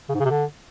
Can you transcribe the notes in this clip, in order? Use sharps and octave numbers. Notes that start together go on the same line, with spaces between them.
C#3
G#2
C#3
C3
D3